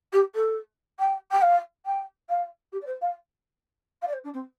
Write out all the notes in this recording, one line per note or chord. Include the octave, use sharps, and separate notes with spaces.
G4
A4
G5
G5
F5
G5
F5
G4
D5
C5
F5
F5
D5
C5
D4
C4